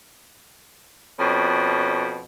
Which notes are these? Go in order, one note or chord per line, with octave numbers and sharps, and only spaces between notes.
F2 B2 C#4